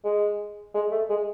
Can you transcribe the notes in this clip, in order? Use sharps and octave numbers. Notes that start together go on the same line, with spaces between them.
G#3
G#3
A3
G#3